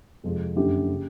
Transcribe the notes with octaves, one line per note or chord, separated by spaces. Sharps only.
F2 C3 F3 G#3
F#1 F#2 D3 G4
C#3